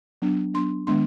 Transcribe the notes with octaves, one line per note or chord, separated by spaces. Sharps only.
F#3 B3 D4
F#3 B3 D4 C6
D#3 G#3 B3 D4 C6